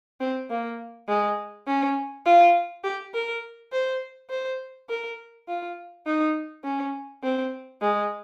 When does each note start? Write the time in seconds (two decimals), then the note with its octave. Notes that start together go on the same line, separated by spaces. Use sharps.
0.21 C4
0.50 A#3
1.08 G#3
1.67 C#4
2.26 F4
2.84 G4
3.14 A#4
3.72 C5
4.30 C5
4.90 A#4
5.48 F4
6.06 D#4
6.64 C#4
7.24 C4
7.82 G#3